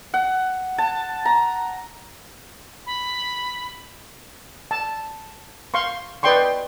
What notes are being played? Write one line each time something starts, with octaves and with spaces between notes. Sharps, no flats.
F#5
A5
A#5
B5
A5
F5 C6 C#6
B4 D5 D#5 G5 C6 C#6